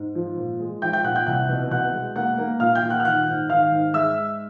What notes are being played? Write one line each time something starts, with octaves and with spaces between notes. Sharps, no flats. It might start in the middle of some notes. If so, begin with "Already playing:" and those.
Already playing: G#2
F3
A#2
G#3
F3 G5 G6
G5 G6
A#2 F#5 F#6
G5 G6
C2 F#5 F#6
B2
B2 F#5 F#6
G#3
A#3 F#5 F#6
A#3
A#2 F5 F6
G5 G6
A#2
F#5 F#6
F6
D#3 F#5 F#6
G#2
D#3 F5 F6
G#2
G#3 E5 E6